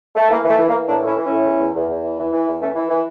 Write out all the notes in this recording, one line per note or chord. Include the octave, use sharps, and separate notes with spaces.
A3
E3 A#3
E3 A3
E3
A#3
E3
A2 A#3 D4
A2 C#4 E4
E3
A2 C#4 E4
E2
E2
E2
E2
E3
E3
E3
E2
E3 A3 C#4
E3
E3